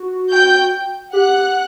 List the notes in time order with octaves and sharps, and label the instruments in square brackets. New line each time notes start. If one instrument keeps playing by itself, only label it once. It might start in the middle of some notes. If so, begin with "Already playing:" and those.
Already playing: [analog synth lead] F#4
[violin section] G5 G6
[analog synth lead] G4 [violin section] F#5 F#6